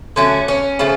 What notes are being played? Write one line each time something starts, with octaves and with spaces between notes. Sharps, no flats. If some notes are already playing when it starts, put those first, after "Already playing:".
D3 F#3 A3 C#4
C#4
C#3 F3 A3